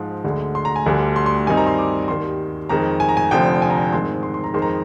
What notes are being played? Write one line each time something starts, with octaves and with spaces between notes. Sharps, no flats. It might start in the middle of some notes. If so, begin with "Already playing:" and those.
Already playing: G#2 F3 G#3
D2 D3 G#3
C6
A#5
G#5
D2 D3 G3 D4
C6
C6
G2 D#3 G3 C4 D#4 G#5
A#5
C6
D6
D#2 D#3 G3 C6
F2 D#3 G#3 A#5
G#5
A#5
G#5
F1 F2 D3 F3 G5
G#5
A#5
G#5
G#2 D#3 G#3 C4 C6
C6
C6
A#5
F2 D#3 G#3 C6
A#5